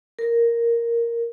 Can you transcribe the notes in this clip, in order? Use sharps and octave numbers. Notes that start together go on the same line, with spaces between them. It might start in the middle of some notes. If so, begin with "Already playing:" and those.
A#4